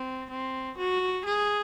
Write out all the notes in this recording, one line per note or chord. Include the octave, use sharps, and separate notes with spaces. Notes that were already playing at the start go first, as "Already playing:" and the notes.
Already playing: C4
C4
F#4
G#4